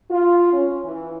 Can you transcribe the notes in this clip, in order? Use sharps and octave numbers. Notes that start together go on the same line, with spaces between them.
F4
C#4
E3